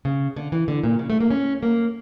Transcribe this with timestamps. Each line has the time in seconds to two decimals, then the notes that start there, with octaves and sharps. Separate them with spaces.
0.05 C#3
0.36 D3
0.52 E3
0.68 D3
0.83 A#2
0.99 C#3
1.10 A3
1.20 A#3
1.31 C#4
1.63 A#3